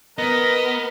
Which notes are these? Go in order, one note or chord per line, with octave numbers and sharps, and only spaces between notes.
B3 A#4 D#5